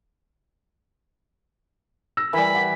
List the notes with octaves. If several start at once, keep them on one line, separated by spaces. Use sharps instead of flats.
E6 A#6
E3 G3 A#4 B5
F#5 D6